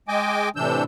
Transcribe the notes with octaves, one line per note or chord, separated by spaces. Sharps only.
G#3 D#5 G5 G#5 D6
A2 C3 E3 D4 E6 G6